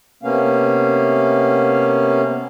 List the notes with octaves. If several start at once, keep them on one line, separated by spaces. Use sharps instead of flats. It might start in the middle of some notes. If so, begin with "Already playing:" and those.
C3 A#3 B3 C#4 F5